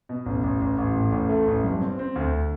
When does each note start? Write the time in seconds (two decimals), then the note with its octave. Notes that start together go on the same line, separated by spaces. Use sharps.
0.09 B2
0.26 A1
0.44 A1
0.61 A1
0.78 A1
0.95 A2
1.12 A1
1.29 A3
1.47 A1
1.64 G2
1.81 C4
1.99 C4
2.16 D2